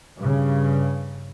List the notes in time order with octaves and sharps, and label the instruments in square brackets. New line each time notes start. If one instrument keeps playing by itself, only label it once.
[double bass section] G2 C#3